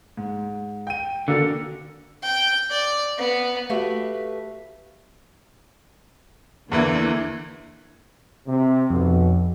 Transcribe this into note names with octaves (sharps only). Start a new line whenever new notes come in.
G#2
G5 D#7
D3 A#3 D4 F#4
G5
D5
B3
A3 F#4 G4 B4 E5 F5
E2 D3 E3 A#3 E4
C3
B1 F2 B2